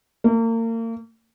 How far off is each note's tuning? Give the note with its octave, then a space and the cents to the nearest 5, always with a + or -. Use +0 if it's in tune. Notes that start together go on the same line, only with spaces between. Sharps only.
A#3 -40